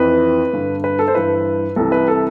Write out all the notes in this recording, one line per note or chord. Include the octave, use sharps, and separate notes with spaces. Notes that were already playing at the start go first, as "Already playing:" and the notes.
Already playing: F2 E3 B4
G2 D3
B4
A4
C5
G2 E3 B4
C2 C3 E3 A4
B4
A4